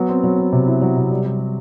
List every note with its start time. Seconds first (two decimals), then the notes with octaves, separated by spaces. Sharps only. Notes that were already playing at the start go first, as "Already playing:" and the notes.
Already playing: F#3 B3
0.09 C4
0.24 F#3
0.38 C4
0.53 C3
0.67 E4
0.82 F#3
0.96 C3
1.11 G3
1.25 G3
1.39 G3